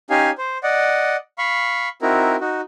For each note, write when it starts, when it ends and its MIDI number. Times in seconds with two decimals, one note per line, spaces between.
0.10 0.31 61
0.10 0.31 63
0.10 0.31 67
0.10 0.31 77
0.10 0.31 80
0.38 0.58 72
0.63 1.16 74
0.63 1.16 75
0.63 1.16 78
1.38 1.89 77
1.38 1.89 83
1.38 1.89 85
2.02 2.36 60
2.02 2.36 63
2.02 2.36 64
2.02 2.36 66
2.02 2.36 70
2.40 2.61 63
2.40 2.61 66